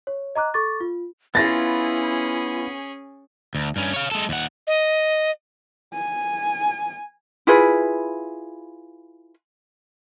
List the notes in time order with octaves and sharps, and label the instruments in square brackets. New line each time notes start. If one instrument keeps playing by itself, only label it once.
[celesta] C#5
D#5 A#5 D6 F#6
A4 C#6 D6 A6
F4
[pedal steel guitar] B3 F4 [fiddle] C#4 G#4 [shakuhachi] E4 [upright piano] A6 A#6
[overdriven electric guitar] D2
G2 C#4
C#5 F5
G#3 A4
D#2 F#5
[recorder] D#5
[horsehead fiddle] G#5
[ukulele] E4 F4 G#4 B4